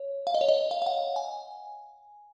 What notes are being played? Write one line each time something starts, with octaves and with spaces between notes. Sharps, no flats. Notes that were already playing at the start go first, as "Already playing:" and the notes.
Already playing: C#5
F5
D#5
C#5
D#5
F5
F5
F#5
G#5